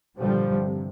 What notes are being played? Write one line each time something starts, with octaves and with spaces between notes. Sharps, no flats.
G2 A#2 D3 F3 G3
C3